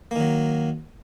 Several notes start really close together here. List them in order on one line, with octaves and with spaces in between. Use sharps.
A#3 D#3 F#3